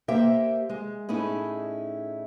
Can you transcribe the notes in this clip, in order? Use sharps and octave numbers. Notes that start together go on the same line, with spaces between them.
A#3 G4 C5 E5 G5
G#3
A2 C#4 D#4 E4 G#4